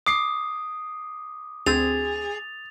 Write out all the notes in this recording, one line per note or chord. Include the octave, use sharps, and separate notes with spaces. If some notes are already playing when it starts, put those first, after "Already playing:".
D6 D#6 C7
D2 C4 G#4 A6 F7